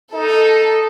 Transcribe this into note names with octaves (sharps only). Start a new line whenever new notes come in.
D#4 A4